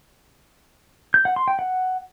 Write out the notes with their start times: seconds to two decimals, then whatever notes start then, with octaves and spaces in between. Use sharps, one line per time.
1.14 G6
1.25 F#5
1.36 C6
1.48 G5
1.59 F#5